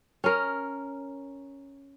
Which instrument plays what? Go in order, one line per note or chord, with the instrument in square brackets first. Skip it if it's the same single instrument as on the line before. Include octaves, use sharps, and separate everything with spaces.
[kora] C#4 A#4